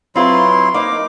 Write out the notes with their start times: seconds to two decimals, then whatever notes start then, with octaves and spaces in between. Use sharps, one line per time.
0.16 F#3 C4 E4 F4 B4 C6
0.74 A#3 D#4 C5 D6